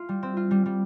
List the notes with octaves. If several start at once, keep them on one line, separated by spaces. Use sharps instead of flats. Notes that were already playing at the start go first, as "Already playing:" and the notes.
Already playing: F4
G3
C4
F4
G3
G3